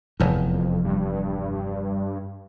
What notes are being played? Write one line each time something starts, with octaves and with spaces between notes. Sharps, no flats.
F1 E2
F2
G2